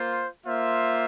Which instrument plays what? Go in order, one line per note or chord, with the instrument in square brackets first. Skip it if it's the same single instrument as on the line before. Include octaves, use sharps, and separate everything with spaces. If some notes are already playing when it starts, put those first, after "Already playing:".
Already playing: [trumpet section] A#3 F4 C5
A#3 F4 C5 E5